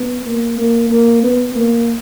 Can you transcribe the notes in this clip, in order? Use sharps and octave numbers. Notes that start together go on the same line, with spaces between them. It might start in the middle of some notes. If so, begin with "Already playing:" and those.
Already playing: B3
A#3
A#3
A#3
B3
A#3